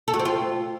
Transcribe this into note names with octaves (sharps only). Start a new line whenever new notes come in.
A4
F#4
C4
F4